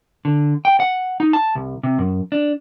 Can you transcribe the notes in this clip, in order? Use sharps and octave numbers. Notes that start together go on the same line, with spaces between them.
D3
G5
F#5
D#4
A5
C2
C3
F#2
D4